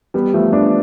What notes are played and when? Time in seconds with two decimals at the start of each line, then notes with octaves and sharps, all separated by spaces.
0.14 G3 B3
0.33 F3 A3
0.53 B3 D4